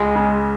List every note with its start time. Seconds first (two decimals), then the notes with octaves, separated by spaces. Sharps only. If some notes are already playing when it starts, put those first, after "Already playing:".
Already playing: C#2 G#3
0.15 C#3